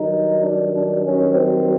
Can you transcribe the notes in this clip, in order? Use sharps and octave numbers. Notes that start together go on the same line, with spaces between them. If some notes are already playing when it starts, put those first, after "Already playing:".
Already playing: G2 D#3 F#3 D#4
D4
D4
C#4
C4